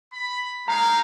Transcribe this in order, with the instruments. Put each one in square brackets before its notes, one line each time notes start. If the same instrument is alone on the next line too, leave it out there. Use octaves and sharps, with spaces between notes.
[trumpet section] B5
[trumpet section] G#3 D#4 F5 [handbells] A#5